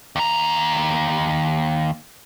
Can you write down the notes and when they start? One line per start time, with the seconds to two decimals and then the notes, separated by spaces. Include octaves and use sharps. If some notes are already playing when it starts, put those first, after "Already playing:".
0.16 D#2 A#5